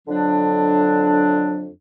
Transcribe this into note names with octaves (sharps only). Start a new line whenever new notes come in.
F2 D3 F#3 D4